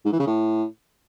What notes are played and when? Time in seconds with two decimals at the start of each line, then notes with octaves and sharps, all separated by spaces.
0.05 G#2
0.12 E3
0.20 C#3
0.27 A2